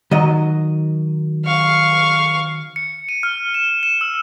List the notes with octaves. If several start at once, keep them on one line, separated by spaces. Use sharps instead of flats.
D#3 F#3 D#5
F5 C#6
C#7
D#7
F6
E7
E7
E6